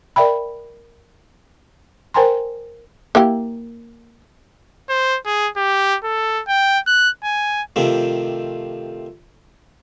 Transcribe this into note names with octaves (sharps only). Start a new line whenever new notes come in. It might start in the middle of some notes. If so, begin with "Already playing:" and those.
A#4 D5 E5 G5 B5
A#4 C5 G5 G#5 A#5 C6
A#3 E4 G4
C5
G#4
G4
A4
G5
F#6
G#5
C3 D#3 F3 A3